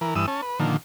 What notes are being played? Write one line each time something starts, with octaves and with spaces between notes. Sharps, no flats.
E3 A#4
G2 E3 D#6 E6
C#4 A5
B4
A#2 D3 D#3 F3